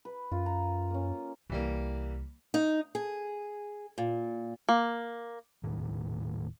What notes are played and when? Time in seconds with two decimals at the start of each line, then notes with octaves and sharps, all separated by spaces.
0.05 B4
0.32 F#2 F4
0.46 A#5
0.91 A#3 C#4
1.50 C2 E3 G3 A#3
2.54 D#4
2.95 G#4
3.98 A#2
4.69 A#3
5.64 D#1 A2 D#3